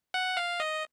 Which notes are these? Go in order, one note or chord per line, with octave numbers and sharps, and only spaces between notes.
F#5
F5
D#5